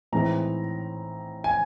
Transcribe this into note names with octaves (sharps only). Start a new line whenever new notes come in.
A2 E3 G#3 C4 D#4 A#5
G#5